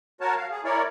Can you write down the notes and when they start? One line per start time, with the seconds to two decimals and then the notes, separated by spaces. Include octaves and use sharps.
0.21 F#4 A#4 C#5 A5
0.36 F5
0.51 G#4
0.64 E4 A#4 C#5 D5